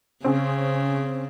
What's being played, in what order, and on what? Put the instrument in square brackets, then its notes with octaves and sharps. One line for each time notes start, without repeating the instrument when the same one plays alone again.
[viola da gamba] C#3 [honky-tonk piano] C4 C#4 G#4